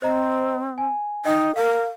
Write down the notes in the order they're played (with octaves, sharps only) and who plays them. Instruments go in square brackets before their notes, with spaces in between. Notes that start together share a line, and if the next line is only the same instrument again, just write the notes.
[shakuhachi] C4 [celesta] C5 D#5 A#5
[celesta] G#5
[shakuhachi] D#4 [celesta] D#5 G5 D#6
[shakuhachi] A#4 [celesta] F5